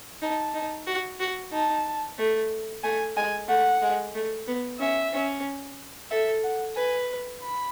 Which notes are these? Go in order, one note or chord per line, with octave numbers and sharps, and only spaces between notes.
D#4 A5
D#4
F#4
F#4
D#4 A5
A3
A3 G#5
G#3 G#5
A3 F#5
G#3
A3
B3
C#4 E5
C#4
A4 E5
F#5
B4 G#5
B5